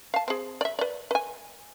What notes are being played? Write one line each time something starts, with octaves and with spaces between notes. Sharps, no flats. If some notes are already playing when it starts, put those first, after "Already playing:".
F5 A5
C4 G#4
D5 E5
B4 D5
B4 G#5